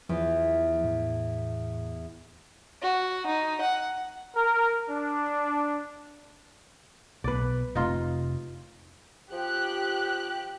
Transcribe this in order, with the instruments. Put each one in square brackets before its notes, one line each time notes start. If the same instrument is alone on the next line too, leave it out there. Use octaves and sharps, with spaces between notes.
[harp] E2 [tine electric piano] F3
[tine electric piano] A2
[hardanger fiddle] F#4
D#4
F#5
[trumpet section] A#4
D4
[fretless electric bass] B1 B2 [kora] B4 D5
[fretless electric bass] F1 C3 A3 [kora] D#4 F4
[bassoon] F3 [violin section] G4 F#6